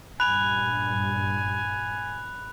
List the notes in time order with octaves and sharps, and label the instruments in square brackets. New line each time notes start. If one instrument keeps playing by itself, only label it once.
[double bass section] G2 A#2 [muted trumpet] G#5 [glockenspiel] B5 [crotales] F#6 F7